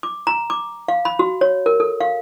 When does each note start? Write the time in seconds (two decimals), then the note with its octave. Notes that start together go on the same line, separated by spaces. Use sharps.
0.03 D6
0.27 A#5
0.50 D6
0.88 F5
1.05 B5
1.19 F#4
1.41 C#5
1.66 A#4
1.80 A4
2.00 F5